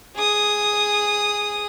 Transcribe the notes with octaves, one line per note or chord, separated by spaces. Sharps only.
G#4 D#6